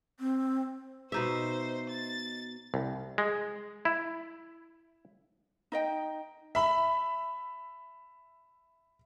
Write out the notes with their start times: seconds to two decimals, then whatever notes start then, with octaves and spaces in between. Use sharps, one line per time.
0.20 C4
1.12 B2 D#4 C5 E5
1.90 A6
2.74 C2
3.18 G#3
3.85 E4
5.72 D#4 D#5 G5
6.55 E5 B5